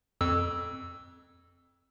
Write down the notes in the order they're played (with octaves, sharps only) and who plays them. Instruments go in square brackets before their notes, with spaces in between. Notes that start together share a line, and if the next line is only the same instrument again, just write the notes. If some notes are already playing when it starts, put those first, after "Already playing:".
[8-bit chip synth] F2 E6